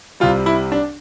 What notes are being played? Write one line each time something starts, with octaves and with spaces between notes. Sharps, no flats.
C2 C3 G3 F4
E4
D4